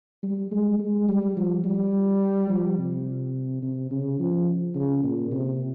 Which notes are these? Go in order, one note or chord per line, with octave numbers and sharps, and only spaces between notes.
G3
G#3
G#3
G3
F3
G3
F3
C3
C3
C#3
F3
C#3
A#2
C3